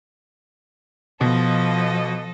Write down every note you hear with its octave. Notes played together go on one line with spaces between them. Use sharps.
B2 F3 A4 D#5